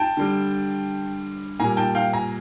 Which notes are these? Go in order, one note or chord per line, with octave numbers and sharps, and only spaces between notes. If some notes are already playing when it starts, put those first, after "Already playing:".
Already playing: G5 A5
D3 G3
A#2 G3 G#5 A#5
G5 A5
F5 G5
G#5 A#5